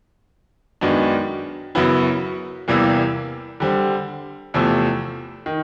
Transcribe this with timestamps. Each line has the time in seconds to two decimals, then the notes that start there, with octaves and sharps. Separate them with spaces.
0.81 F#2 D#3 G#3 B3 D4
1.75 F#2 C#3 F#3 B3 E4
2.68 E2 C3 E3 G3 A#3
3.60 D3 G3 C4
4.54 E2 C3 F3 A3
5.46 D#3